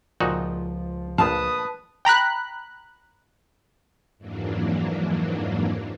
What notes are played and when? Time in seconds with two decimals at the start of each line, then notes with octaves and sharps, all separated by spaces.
0.20 C#2 A#2 F3 D#4 F#4
1.18 A#1 B4 F5 A5 D#6
2.05 G5 A#5 B5 F#6
4.18 F2 G#2 E3 F#3 A#3 D4